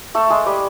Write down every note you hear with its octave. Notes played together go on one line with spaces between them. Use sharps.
A3 A4
G#3 G#4
G3 G4